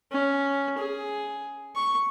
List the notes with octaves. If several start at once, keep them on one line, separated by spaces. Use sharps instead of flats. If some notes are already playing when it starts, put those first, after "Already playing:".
C#4
G#4
C#6